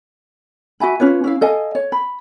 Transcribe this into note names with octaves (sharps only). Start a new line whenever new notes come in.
F#4 E5 G#5 B5
C#4 F4 B4 C#5
C#4 E4 F5
A4 D#5 F5 G#5
C#5
B5